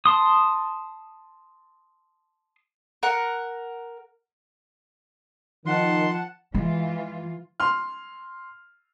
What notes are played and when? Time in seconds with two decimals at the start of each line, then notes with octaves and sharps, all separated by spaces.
0.05 A5 C6 D#6
3.03 A#4 F#5
5.66 D#3 F3 F#5 A5 C6
6.54 E3 G#3 F4
7.60 C6 F6